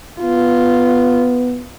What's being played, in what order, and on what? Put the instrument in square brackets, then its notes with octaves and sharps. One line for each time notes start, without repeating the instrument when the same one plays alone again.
[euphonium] B3 [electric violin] F4